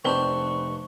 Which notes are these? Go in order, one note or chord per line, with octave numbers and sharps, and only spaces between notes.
F1 C4 D4 B4 C5 C#6 G7